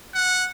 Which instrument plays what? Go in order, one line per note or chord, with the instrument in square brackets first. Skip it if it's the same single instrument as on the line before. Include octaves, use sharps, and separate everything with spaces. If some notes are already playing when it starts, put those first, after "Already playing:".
[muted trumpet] F#5